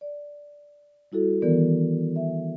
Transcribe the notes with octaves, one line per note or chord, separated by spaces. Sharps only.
D5
G3 E4 F#4 A4
D#3 E3 B3 A#4 D5
E5